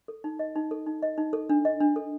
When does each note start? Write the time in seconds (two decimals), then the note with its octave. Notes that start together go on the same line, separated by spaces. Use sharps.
0.08 A4
0.24 D#4
0.39 D#5
0.55 D#4
0.71 A4
0.86 D#4
1.03 D#5
1.18 D#4
1.33 A4
1.49 D4
1.65 D#5
1.81 D4
1.96 A4